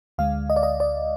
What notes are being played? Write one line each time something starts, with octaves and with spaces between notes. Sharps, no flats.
D2 D3 G#3 F5
D#5
D5
D#5
D5